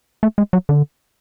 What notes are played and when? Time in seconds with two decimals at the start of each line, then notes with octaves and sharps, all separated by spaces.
0.23 A3
0.38 G#3
0.53 F#3
0.69 D3